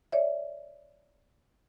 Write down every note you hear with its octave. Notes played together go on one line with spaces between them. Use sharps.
C#5 D5 E5